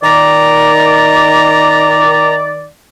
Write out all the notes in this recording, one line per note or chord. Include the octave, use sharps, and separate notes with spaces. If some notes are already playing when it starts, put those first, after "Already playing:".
D#3 D5 A#5